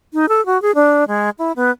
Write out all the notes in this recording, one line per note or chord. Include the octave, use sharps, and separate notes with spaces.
D#4
A4
F#4
G#4
D4
G#3
E4
B3